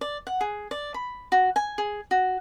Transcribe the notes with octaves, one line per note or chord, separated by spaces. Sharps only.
D5
F#5
G#4
D5
B5
F#4
G#5
G#4
F#4